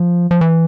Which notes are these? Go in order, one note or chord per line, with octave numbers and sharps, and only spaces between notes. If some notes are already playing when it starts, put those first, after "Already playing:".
Already playing: F3
F3
E3